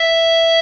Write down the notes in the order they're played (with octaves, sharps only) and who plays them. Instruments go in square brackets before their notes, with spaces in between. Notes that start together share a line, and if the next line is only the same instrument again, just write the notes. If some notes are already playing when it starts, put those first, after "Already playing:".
Already playing: [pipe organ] E5